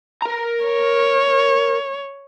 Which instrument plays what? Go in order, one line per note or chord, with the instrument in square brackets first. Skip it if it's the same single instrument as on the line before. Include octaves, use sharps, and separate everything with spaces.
[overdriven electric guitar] A#4 A#5
[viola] C#5